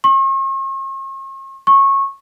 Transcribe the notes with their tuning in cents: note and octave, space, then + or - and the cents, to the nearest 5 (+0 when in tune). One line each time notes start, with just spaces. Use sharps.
C#6 -45
C#6 -20